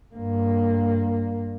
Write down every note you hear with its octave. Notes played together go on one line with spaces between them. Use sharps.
G2 A#3